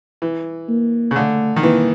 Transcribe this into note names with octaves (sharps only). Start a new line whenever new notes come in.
E3
A#3
C#3
D3 A3
D#3
E3 A#3